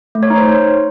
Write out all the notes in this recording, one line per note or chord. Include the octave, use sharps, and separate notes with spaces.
A3
C#5
D#4
C5